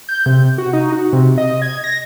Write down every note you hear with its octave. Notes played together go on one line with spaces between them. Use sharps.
G6
C3
F#4
D#4
F#4
C3
D#5
G#6
A#6